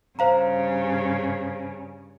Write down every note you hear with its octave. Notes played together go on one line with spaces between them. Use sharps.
G2 C#3 C5 F5 A#5